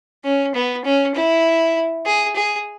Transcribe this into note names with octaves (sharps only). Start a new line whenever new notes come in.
C#4
B3
C#4
E4
G#4
G#4